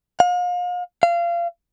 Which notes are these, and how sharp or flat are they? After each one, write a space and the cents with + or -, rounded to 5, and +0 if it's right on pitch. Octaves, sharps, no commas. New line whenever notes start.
F5 +40
F5 -25